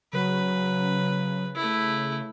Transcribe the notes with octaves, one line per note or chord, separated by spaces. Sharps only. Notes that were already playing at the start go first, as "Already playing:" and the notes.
C#3 F#3 B4
A3 E4